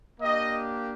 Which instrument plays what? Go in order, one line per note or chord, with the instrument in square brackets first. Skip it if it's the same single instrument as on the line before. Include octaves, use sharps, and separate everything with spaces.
[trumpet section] A#3 D4 G4 D#5